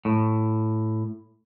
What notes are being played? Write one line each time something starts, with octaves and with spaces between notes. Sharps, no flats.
A2